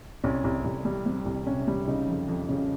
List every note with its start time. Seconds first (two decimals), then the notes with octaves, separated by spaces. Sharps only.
0.24 C2 C#4
0.44 C2
0.65 C2
0.85 G3
1.06 G3 C4
1.26 C2
1.46 C3 C#4
1.68 G3
1.88 C#3 D#4
2.08 F2
2.28 F2
2.49 C#3